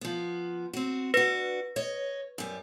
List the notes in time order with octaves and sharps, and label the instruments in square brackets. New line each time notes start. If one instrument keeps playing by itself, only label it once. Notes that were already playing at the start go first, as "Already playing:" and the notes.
[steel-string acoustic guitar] F3 B3
C4 F#4
[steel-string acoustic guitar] D4 F#4 [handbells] B4 A#6
[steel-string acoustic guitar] C#5 D#5
F#2 G3